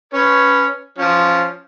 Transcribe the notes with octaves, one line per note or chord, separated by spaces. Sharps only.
C#4 B4 C#5
F3 C#4